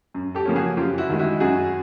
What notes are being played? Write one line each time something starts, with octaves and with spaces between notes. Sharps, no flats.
F#2
G4 A4
C#3 F3 A#3 C#4
F#4 G#4
F#2 F4 G4
E4 F#4
D#3 G#3
E4 F#4
F#2 F#4 G#4